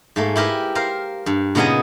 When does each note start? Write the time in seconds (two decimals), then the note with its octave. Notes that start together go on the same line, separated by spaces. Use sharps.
0.16 G#2 A3 A#3
0.36 E4 G4 A#4 B4
0.75 A#4 C5 F5
1.26 G2
1.55 A#2 C#3 B3 D#4 G#5 A#5